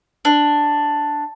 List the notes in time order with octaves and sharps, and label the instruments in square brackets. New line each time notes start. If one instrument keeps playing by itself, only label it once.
[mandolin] D4